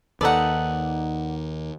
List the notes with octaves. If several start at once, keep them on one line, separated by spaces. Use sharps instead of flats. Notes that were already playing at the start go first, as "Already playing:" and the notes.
D#2 D#4 A4 B4 D5 F#5